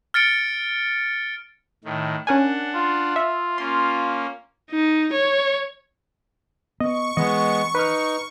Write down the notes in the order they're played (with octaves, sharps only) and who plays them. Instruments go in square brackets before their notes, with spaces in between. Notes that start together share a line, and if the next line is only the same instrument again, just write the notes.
[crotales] F6 A6 C#7 D7
[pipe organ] A2 D#3
[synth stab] C#4 A#4 G#5 [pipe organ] D4 F#5
[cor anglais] F4
[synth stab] E5
[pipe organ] A#3 C#4 [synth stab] C6
[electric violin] D#4
C#5
[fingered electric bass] B3 [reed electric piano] D#5 [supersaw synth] C#6
[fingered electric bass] E3 [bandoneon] G#3 B3 [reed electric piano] D#5
[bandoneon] D#4 [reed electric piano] B4 F6